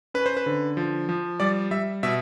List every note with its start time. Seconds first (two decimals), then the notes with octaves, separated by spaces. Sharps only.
0.14 C#4 B4
0.26 C5
0.37 B4
0.46 D3
0.77 F3
1.09 F3
1.40 G3 D5
1.71 G3 E5
2.03 B2 E5